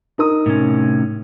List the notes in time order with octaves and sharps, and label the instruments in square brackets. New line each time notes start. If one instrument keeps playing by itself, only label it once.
[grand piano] D#4 A#4 D#6
[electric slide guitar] A2 C3 C#4